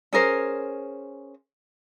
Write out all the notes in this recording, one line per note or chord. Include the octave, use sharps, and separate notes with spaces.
C#4 G#4 A#4 C5